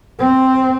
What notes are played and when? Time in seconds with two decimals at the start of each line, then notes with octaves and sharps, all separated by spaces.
0.19 C4